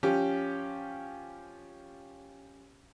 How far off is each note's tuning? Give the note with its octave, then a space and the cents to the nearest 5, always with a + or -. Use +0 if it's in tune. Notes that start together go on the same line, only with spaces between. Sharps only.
F3 +0 C#4 +0 G4 +0